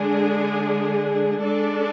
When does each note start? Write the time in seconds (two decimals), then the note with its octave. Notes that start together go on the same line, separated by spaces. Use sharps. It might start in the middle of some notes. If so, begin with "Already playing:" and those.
Already playing: D3 G#3 D4 G#4
1.41 G#3 D4 A4 D5